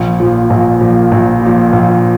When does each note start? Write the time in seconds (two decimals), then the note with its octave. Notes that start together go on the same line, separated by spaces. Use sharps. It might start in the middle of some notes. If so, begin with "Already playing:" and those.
Already playing: A#1
0.20 A#2 F3
0.50 A#1
0.81 A#2 F3
1.12 A#1
1.42 A#2 F3
1.73 A#1